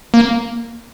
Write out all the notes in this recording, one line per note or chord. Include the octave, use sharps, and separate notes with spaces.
A#3